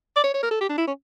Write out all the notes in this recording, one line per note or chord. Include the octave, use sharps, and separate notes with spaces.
D5
C#5
C#5
A#4
A4
G4
D4
E4
C#4